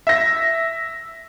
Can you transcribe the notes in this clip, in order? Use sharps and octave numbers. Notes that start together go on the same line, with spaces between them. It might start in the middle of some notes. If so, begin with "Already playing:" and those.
E5 A#6